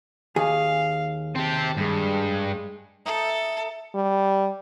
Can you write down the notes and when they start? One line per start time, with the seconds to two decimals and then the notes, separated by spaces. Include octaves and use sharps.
0.36 D#2 G#4 F5
1.35 C4 G4 A5
1.77 G2 G#3
3.06 D#4 A4 E5
3.95 G3